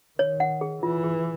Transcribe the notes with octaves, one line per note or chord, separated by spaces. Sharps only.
D#3 C#5
F#5
G#4
E3 F4
G#4